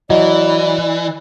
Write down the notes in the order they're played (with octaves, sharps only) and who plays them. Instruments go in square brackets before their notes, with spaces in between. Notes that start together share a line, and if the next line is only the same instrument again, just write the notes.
[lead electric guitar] E3 [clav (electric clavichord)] F#3 E4 [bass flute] D5 [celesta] D#5